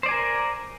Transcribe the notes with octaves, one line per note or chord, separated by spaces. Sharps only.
A#4 C5 D5 G#5